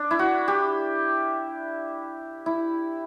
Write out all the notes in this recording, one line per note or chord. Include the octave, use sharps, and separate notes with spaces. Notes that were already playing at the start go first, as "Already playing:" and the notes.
Already playing: D4
E4
F#4
G4
E4